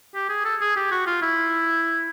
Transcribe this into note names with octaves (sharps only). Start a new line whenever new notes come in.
G4
G#4
A4
G#4
G4
F#4
F4
E4